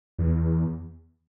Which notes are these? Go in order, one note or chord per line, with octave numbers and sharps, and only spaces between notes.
E2